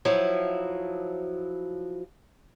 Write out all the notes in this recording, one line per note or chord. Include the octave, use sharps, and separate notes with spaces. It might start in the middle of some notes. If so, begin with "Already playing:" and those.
F3 F#3 E4